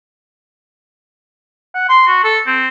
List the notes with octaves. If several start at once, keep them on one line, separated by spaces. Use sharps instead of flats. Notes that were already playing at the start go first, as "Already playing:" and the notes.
F#5
C6
F#4
A4
C4